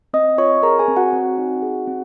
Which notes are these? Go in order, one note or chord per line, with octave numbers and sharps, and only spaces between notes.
C4 D#5 D#6
F4 C#5 C#6
G#4 A#4 A#5
G#4 G#5
C4
F#4 F#5
C4
D#4
G#4
C4